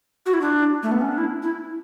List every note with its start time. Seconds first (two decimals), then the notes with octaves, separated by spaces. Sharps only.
0.26 F#4
0.33 E4
0.41 D4
0.83 A3
0.92 B3
1.01 C#4
1.09 D4
1.18 E4
1.43 E4